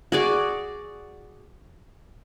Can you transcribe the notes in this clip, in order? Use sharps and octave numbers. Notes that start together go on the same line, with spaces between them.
F#4 G#4 D5